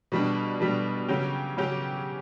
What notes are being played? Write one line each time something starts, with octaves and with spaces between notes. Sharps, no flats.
B2 G3 D4
B2 G3 D4
C#3 F#3 C#4 G4
C#3 F#3 C#4 G4